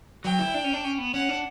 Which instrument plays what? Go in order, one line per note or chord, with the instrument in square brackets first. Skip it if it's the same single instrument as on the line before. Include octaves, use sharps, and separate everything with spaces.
[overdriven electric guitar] F#3 [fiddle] G5
[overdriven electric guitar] E4
D4
C#4
D4
C#4
B3
[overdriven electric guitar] C#4 [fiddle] F#5
[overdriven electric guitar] D4